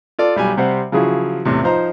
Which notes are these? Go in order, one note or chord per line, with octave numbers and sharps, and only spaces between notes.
F4 A4 D5
B1 G3 G#5
C3 G3 C5 F#5
C#3 F3 F#3 E4 G#4
E2 A2 C3
F3 D#4 C5 A#5